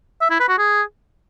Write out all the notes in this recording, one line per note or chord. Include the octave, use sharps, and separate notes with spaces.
E5
E4
B4
F#4
G#4